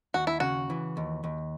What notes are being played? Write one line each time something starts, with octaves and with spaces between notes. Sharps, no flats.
D#2 F#4
E4
C#3 F#4
E3
D#2
D#2